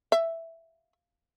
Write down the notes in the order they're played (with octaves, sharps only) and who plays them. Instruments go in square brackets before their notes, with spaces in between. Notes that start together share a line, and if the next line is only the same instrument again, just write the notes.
[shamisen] E5